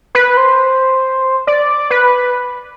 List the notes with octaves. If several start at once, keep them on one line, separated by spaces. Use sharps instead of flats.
B4
C5
D5
B4